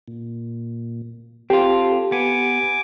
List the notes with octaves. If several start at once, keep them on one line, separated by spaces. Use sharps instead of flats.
A#2
C4 F4 G4 A4
B3 G#5 D6